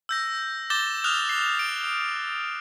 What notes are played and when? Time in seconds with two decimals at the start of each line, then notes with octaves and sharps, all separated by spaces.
0.09 E6 G6 A#6
0.70 D6 G6 A6 A#6 E7 G7
1.04 D#6 F6 F#6 F7
1.29 C7
1.59 D7